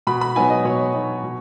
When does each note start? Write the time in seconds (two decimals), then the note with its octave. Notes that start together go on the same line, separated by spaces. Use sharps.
0.07 B2 B5
0.21 B5
0.35 F#3 B3 D#4 G#5
0.50 D#5
0.65 B2 C#5
0.93 F#3 B3 D#4
1.23 B2